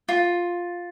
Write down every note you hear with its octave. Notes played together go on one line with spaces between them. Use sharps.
F4